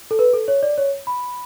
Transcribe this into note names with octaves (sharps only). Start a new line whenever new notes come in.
A4
B4
A4
C#5
D5
C#5
B5